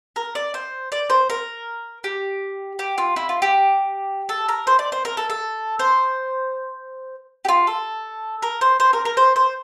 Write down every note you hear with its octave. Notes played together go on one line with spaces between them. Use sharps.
A#4
D5
C5
D5
C5
A#4
G4
G4
F4
E4
F4
G4
A4
A#4
C5
D5
C5
A#4
A4
A4
C5
G4
F4
A4
A#4
C5
C5
A#4
A#4
C5
C5